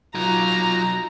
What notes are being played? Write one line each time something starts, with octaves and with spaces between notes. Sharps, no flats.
F#3 D#4 F4 A#5